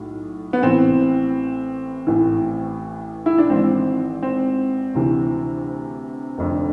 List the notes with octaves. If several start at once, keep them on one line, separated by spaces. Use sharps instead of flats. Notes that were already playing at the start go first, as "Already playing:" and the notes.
Already playing: B1 A2
B3
A1 A2 E3 C4
A1 A2 E3
E4
D4
G#1 G#2 E3 C4
C4
D2 C3 E3
F1 F2 D3